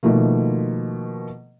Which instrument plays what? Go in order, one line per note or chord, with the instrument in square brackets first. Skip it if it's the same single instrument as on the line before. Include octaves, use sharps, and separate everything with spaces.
[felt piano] B2 D#3 F3 A3 A#3